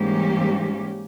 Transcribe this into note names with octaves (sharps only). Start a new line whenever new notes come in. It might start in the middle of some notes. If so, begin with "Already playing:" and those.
Already playing: G#2 E3 G3 A#3 C#4 G4
G#2